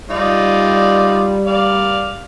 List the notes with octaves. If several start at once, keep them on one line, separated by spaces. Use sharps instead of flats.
G3 D#4 F4 D5
D5 F5